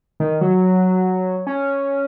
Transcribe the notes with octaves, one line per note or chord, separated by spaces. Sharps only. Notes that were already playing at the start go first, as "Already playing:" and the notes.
D#3
F#3
C#4